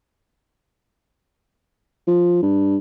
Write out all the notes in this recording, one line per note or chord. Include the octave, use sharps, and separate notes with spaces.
F3
G2